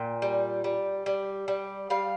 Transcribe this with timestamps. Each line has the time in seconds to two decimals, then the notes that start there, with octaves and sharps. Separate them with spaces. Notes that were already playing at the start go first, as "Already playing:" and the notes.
Already playing: A#2 G5
0.22 G3
0.64 G3
1.06 G3
1.48 G3
1.90 G3 F5